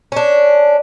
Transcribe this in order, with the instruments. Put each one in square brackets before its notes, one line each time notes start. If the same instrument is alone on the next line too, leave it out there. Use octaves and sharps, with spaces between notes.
[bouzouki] C#4 D4